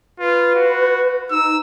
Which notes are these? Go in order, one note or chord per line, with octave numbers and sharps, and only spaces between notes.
F4 B4
F#4
D#4 E6